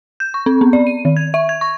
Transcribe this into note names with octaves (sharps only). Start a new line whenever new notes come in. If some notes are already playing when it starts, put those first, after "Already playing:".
G6
C#6
C4
B3
D5
D#7
D#3
G#6
E5
G#6
C#6